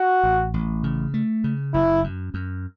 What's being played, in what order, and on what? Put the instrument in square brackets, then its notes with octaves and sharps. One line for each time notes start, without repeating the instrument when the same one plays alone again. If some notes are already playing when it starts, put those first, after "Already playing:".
Already playing: [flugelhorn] F#4
[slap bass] A1
A1
C#3
A3
C#3
[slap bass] F#1 [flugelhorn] E4
[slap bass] F#2
F#2